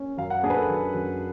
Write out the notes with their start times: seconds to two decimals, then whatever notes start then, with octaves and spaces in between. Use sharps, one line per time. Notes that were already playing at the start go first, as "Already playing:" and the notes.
Already playing: C#4
0.18 F#2 F5
0.30 F#5
0.44 D4 G#4
0.50 B4
0.57 A4
0.69 F#2
0.94 F#2